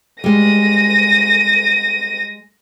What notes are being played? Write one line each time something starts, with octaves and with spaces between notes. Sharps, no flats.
G3 G#3 A#6 D#7